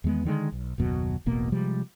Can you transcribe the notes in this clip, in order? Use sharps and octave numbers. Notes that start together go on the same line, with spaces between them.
E2 D#3 G#3 B3
D3 D#3 G3 G#3
B1
F#1 D#2 B2 F#3
E1 A1 B2 A#3
C3 F3 G3 G#3